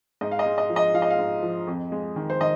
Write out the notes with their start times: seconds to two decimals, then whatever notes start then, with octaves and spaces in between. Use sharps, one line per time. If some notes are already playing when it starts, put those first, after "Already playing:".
0.21 G#2 D#5
0.31 F5
0.39 D#5
0.45 G#3
0.58 D#5
0.70 F3
0.76 D#5
0.94 F3 F5
1.02 D#5
1.10 F5
1.19 G#2
1.43 F3
1.67 F2
1.92 G#3
2.16 D#3
2.30 C5
2.40 D#3 D#5